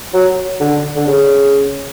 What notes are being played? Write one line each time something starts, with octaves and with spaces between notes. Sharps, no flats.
F#3
D3
D3
C#3